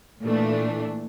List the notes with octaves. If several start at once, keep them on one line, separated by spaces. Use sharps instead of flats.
A#2 E3 A3 D4